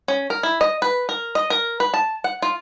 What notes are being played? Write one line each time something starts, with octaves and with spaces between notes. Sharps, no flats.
C#4
A#4
E4
D#5
B4
A#4
D#5
A#4
B4
A5
F#5
F4